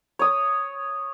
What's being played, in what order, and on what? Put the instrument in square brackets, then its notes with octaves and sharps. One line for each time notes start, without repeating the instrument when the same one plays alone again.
[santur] C#5 D#6